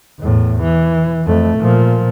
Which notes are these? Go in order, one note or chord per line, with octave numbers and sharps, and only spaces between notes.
E2 A2
E3
F2 A3
A#2 F3